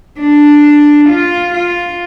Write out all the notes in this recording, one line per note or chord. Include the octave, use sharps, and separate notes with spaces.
D4
F4
F4